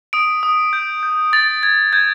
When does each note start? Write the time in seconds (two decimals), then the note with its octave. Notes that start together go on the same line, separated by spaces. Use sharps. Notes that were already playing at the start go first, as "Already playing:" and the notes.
0.13 D#6 D7
0.43 D#6
0.73 G6
1.03 G6
1.33 D#6 A6
1.62 D#6 G#6
1.93 G6 G#6